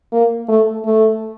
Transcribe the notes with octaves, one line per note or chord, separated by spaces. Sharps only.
A#3
A3
A3